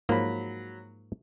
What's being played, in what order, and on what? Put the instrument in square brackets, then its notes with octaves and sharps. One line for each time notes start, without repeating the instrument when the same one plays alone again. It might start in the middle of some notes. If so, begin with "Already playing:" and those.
[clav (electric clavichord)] G#2 F3 A#3 [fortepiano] F#3 B5